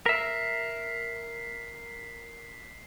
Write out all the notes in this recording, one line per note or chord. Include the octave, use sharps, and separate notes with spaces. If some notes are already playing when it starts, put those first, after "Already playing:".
A#4 E5 B6 C7